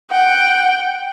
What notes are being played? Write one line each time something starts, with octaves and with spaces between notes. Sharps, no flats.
F#5 G5